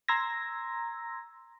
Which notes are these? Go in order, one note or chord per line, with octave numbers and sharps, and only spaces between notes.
A#5 C6 E6 G#6 A#6